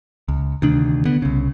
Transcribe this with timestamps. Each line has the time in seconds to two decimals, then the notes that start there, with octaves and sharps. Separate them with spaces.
0.28 C#2
0.62 D2 C3 D#3 D4
1.05 D3 B3
1.22 C2 C#3